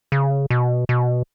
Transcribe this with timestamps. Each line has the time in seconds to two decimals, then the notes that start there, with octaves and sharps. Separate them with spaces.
0.12 C#3
0.50 B2
0.89 B2